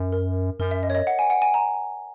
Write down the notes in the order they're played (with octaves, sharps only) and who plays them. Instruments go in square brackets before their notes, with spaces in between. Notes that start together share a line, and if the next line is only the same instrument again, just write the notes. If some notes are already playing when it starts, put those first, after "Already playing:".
Already playing: [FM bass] F#2
[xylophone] A#4
[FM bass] F#2 [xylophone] A#4
[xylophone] E5
D#5
C#5
D#5
F#5
G#5
F#5
G#5
A#5